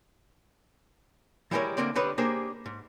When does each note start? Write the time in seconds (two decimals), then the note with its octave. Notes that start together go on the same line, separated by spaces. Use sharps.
1.51 E3 G3 G#3 E4 A#4 C#5
1.77 D2 D3 A#3 C4 D5
1.96 D3 G3 B4 C#5 D#5
2.18 A#3 D4 G4 G#4 A#4 C5
2.66 G#2